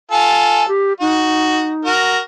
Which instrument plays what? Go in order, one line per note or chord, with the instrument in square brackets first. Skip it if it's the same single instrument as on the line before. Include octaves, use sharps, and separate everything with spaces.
[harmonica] F4 A4 [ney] G#5
[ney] G4
[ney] D#4 [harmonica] F#4
[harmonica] F#4 A#4